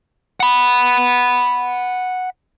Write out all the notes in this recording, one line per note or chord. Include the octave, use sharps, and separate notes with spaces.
F#5 B5